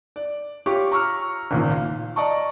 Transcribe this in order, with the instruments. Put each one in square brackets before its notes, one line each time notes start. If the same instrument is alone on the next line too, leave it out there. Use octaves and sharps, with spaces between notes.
[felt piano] D5
F4 G4 C#5 C#6 D6
A#5 C#6 E6 F6
G#1 C#2 A#2
F5
D5 D#5 A5 A#5 C#6